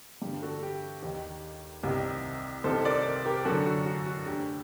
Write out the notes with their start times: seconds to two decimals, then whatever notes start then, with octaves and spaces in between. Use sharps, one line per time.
0.22 G2 D3 G4
0.42 F#4 A4
0.63 G4
1.02 D#2 D#3 G4
1.83 C2 C3 D#3 G4
2.64 C2 C3 D#3 A4 C5
2.85 A#4 D5
3.25 G4 A#4
3.45 F#2 D3 F#4 A4
3.66 F#4
3.86 F#4
4.06 F#4
4.26 D2 D3 G4